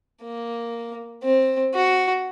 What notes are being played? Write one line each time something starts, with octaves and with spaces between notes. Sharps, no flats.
A#3
C4
F#4